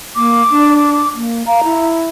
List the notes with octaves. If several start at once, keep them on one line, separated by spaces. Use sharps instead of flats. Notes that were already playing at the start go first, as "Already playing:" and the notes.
A#3 D6
D4
A#3
F5 A#5
E4